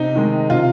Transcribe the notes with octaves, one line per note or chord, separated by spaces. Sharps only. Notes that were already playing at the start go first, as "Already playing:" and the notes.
Already playing: C3 D#4
D#3 G#3
C3 F4